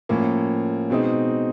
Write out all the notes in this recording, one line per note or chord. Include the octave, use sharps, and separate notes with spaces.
A2 F3 A#3 C#4
B2 G#3 C4 D#4